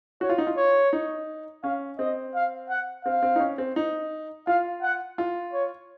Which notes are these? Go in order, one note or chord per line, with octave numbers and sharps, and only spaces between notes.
F#4 C#5
F4
D#4
F4
C#5
D#4
C#4 F5
C4 D#5
F5
F#5
C4 F5
C4
D#4
C#4
C4
D#4
F4 F5
F#5
F4
C#5